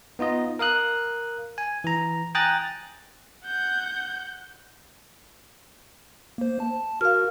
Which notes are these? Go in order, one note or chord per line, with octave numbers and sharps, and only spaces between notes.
B3 D#4 F4 D#5
A#4 F5 D#6 F#6
G#5
E3 A#5
G5 G#5 A#5 D#6 F#6 A6
F#5 G6
A#3 C5
A5
F#4 A#4 F5 F6